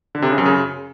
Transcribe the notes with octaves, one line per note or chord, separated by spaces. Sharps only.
D3
C3
C#3
F#2
C#3